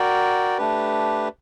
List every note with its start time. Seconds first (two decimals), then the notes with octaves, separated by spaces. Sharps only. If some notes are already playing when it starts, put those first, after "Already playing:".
Already playing: F#4 A#4 D5 G5
0.58 A3 D4 G4 B4